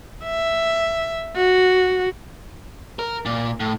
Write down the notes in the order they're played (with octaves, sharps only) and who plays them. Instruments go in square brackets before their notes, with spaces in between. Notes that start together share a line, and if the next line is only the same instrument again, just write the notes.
[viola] E5
F#4
[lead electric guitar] A#4
A#2
A2